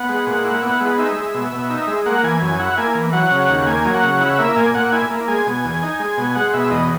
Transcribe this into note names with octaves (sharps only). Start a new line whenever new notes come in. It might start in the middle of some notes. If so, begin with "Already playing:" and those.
Already playing: B3 F#5
G#3
A#2
E4
B3
G#3
D#4 E5
G#3
B2
B2
D#4
G#3
A#3 F#5
E3 G#5
F#2 G#5
E4 F#5
A#3 G#5
E3
F#3 F#5
C#3
F#5
D#2
A#3 G#5
F#3
F#5
C#3
E4 F#5
A#3 E5
A#2 G#5
A#2 F#5
E4 G#5
A#3
G#3 G#5
B2
E2
D#4
G#3
B2
G#5
G#3 F#5
B2 E5
E2 D#5